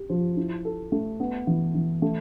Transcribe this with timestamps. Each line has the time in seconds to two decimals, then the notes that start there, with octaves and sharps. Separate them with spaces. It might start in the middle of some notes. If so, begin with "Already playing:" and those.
Already playing: G4
0.10 F3
0.37 E4
0.65 A4
0.92 A3
1.20 B3
1.47 E3
1.75 E3
2.02 A3